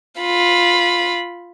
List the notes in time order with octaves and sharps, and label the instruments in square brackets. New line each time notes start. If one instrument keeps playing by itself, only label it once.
[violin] F4 B5